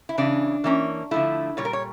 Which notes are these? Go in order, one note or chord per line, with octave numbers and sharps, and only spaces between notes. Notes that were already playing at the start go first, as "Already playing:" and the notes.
E4
C#3 E3 C#4 D4
E3 A#3 C#4
D3 F3 A3 E4
A#2 G3 C#5
A#4
C#5